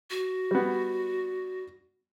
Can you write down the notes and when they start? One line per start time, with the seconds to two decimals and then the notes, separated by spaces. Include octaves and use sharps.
0.10 F#4
0.51 G3 B3